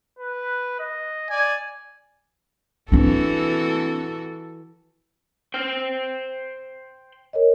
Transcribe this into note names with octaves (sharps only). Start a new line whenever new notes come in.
B4
D#5
D5 G#5
E3 C4 D4 F#4 A4
C5 G5 F6
A#4 C#5 D#5